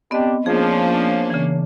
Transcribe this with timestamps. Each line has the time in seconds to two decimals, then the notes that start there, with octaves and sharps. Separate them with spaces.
0.11 B3 C4 D4 G4 D#5
0.46 F3 A#3 C#4 D4 G#4
1.30 C#3 E3